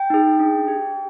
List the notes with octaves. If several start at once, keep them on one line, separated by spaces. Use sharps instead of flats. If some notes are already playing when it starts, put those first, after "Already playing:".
Already playing: G5
D#4 G#4
D4
G4